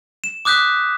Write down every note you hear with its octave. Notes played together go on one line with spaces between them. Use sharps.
E7
D6 D#6 F#6 G6 B6